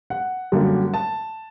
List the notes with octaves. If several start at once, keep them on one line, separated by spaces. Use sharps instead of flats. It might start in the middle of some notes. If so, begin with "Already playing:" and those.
F#5
F#2 D3 G3 A#3
A5